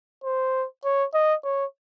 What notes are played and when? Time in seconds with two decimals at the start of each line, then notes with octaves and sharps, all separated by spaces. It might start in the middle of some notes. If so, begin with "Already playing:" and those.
0.24 C5
0.84 C#5
1.14 D#5
1.44 C#5